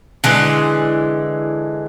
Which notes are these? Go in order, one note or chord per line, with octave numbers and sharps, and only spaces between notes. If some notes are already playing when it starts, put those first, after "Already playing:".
D3 E3 G#3